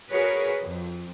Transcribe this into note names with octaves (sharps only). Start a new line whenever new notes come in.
F#4 G#4 A#4 B4 C#5
F2